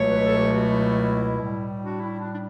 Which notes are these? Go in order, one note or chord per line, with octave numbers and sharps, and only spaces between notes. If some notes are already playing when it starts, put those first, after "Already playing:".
Already playing: C#2 B2 F#3 A3 C#5
B4
A4
G4
F#4
E4
A2 G3
D4 F#4
E4
D4
D4